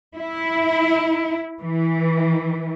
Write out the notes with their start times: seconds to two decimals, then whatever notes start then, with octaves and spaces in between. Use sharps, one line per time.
0.16 E4
1.60 E3